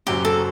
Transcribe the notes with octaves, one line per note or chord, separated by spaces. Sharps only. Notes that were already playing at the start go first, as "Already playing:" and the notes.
F#1 F#2 F#3 G4
A4